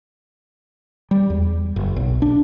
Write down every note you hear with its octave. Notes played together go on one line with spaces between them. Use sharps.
G3
E2
F#1
B1
D4